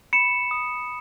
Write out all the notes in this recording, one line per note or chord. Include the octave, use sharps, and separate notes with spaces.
B5 C#7 E7
D#6